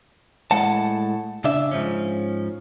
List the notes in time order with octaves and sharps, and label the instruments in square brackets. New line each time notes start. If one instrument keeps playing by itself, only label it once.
[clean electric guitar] A2 G#3 F#5 A5
C#3 D4 E5
G#2 F3 C#4